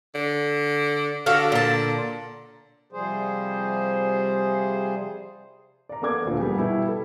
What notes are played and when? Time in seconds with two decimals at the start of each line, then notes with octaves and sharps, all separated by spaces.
0.15 D3
1.26 D3 F#4 A4 F5
1.52 A#2 A5
2.92 C3 F3 G3 G#4 C5
5.89 D5 A#5
6.02 A#3 B3 A4 D5 D6 G#6
6.25 D2 A#2 A3
6.37 G3 B3 G4 G#4
6.58 B2 G3 E4
6.88 A4